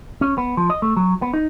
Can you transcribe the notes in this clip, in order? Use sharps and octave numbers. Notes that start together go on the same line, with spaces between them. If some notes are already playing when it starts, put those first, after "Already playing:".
C#4
B3
F3
D#5
A3
F#3
B3
D#4